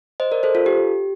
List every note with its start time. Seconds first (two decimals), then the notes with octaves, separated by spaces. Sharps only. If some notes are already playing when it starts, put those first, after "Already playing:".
0.20 C5 D#5
0.31 A#4 D5
0.43 A4 C5
0.55 F4 A4
0.66 G4